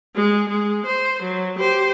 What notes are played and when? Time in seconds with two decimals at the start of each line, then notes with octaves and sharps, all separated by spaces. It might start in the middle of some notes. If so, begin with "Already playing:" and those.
0.15 G#3
0.49 G#3
0.86 C5
1.23 F#3
1.59 G4 C5